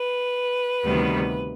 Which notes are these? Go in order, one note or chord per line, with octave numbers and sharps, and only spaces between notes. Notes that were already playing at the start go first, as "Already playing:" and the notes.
Already playing: B4
D2 C3 D#3 G3 B3